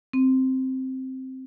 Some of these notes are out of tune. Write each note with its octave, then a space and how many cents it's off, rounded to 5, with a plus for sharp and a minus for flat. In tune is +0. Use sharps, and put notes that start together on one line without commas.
C4 +0